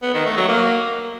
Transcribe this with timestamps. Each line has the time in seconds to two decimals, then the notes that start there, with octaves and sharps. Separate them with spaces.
0.02 B3
0.14 D#3
0.25 A3
0.37 F#3
0.48 A#3